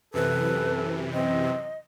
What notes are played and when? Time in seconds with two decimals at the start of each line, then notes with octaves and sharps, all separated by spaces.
0.14 F#2 C3 E3 A4 B4
1.13 C4 D#5